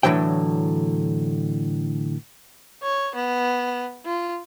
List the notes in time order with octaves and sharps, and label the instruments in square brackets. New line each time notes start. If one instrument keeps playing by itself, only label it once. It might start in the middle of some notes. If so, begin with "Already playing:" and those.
[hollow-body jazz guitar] A2 D3 E3 F#3 G5
[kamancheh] C#5
B3
F4